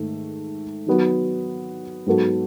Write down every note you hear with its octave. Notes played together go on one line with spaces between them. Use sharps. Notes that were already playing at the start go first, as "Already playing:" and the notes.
Already playing: G#2 D#3 A3
D#3 F#3 B3 F#4
G#2 F#3 B3 F#4 A4